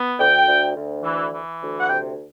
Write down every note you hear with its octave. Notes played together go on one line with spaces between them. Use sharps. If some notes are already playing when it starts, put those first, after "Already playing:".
Already playing: B3
D2 G5
D2
D2
E3
E3
D2
F#5
C3 G5